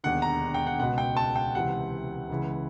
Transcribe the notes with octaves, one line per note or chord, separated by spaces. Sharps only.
E1 D#2 D3 F#5
A#5
G5
F#5
C#2 B2 F#5
G5
A5
G5
C#2 C3 E3 F#5
C#2 C#3 E3